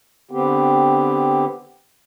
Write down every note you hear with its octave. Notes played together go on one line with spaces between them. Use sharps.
D3 B3 C4 G4